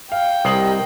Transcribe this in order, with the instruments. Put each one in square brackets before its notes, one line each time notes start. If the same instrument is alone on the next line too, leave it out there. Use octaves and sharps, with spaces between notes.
[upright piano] F5 [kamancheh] G5
[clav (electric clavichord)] C2 [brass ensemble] G4 A#4 D#5 [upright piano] D#6 C7 F#7